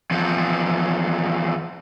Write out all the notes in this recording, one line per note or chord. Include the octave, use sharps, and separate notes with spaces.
E2 F3